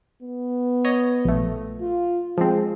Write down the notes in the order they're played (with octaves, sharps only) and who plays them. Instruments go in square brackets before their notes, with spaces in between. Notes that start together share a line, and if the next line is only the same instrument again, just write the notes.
[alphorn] B3
[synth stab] C#5 D#5
A#1 A3
[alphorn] F4
[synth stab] F3 C4 [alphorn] G#3